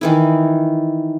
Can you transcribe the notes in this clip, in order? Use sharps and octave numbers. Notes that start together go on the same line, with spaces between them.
D#3 E3 E4